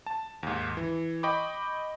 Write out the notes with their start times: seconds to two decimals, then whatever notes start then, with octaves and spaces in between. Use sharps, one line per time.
0.06 A5
0.43 D#2 G#2
0.77 E3
1.23 D#5 G5 B5 C#6 D6